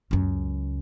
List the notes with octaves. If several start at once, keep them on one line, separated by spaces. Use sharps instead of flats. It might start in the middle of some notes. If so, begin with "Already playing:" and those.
C#2 F#2